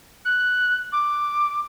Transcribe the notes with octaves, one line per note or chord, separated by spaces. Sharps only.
F#6
D6